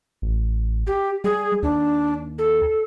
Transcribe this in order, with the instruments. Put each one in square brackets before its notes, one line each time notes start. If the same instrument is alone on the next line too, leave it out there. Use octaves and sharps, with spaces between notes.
[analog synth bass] A1
[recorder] G4
[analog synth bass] G3 [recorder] G#4
[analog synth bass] D#2 [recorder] D4
[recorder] A4